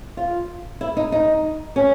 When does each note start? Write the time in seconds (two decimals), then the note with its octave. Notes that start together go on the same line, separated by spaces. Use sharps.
0.17 F4
0.81 E4
0.97 D#4
1.12 D#4
1.76 C#4